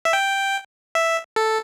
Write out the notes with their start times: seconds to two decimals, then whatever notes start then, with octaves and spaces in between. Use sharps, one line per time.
0.05 E5
0.13 G5
0.95 E5
1.36 A4